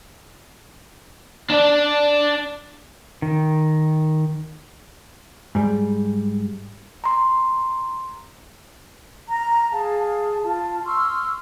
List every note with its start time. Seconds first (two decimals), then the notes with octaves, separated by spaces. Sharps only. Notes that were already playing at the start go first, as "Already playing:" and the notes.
1.51 D4 D5
3.22 D#3
5.55 G#2 G3
7.04 A#5 C6
9.28 A#5
9.71 G#4 F5 A5
10.43 F4 A5
10.85 C6 C#6 E6 F6